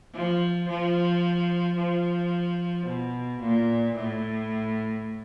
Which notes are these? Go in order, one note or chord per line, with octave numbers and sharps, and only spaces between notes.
F3
F3
F3
B2
A#2
A2